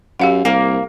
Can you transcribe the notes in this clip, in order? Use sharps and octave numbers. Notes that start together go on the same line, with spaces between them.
F#2 G4 F5 F#5
C2 A#3